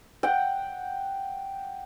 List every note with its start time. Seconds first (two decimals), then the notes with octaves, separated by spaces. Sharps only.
0.23 F#5 G5